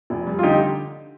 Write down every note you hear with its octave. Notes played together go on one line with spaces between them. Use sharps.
F1
G3
F4
D3 D#4 G4